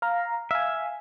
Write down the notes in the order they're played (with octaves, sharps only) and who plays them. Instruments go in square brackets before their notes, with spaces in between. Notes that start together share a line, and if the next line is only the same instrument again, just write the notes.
[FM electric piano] F5 A#5
[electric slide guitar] E5 [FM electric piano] F5 G#5